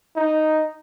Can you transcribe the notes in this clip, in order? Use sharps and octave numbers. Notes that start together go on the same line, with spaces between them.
D#4